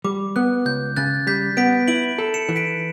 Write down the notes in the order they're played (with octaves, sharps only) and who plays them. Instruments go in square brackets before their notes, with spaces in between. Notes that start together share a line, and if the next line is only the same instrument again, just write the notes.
[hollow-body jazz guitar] G3 [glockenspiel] D6
[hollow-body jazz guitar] B3 [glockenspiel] F#6
[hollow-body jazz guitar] C#2 [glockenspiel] G6
[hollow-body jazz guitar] C#3 [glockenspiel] F#6 A6
[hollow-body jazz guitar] G3 [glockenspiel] G6 B6
[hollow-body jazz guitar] B3 [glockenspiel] B6 D7
[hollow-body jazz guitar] E4 [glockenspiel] D7 F#7
[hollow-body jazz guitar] A4
[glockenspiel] C#7 E7
[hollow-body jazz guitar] E3
[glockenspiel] B6 D7